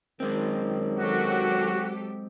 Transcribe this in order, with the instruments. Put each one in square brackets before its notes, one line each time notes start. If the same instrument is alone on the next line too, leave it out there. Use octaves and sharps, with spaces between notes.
[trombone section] F#2 D#3 [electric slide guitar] G#3 C4
[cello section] F#3 G4 A4 [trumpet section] F#4